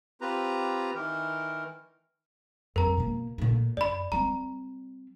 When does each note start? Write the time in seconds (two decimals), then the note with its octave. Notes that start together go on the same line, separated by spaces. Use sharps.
0.21 C4 F4 G4 B4 A#5
0.95 D#3 E3 A#4
2.76 F2 F#3 A#4 A#5
2.97 B2 A#3
3.38 A#2 A3
3.77 F#2 D5 B5
4.12 G3 C4 A#5